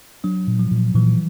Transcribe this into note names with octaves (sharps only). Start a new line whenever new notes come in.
F#3 D4
A#2
F3
A#2
A#2 E3